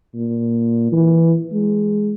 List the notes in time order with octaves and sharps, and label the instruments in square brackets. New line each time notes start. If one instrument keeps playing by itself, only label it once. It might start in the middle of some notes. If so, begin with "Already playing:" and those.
[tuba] A#2
E3
G#3